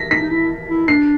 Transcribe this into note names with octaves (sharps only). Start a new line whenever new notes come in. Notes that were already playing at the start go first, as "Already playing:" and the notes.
Already playing: A#6 B6
D#4 B6
D#4
E4
E4
D4 C7